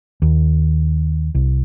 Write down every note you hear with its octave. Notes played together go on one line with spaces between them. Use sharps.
D#2
C2